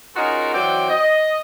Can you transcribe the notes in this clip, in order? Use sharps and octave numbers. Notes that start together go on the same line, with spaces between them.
C#4 D#4 F4 F#4 G#4 A#4
E3 F#3 C4 D5 G5
D#5